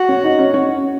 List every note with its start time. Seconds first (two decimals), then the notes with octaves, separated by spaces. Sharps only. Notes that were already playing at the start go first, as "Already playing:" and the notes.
Already playing: F#4
0.09 C#4 C#5
0.24 D#4 D#5
0.39 C#4 C#5
0.54 C#4 C#5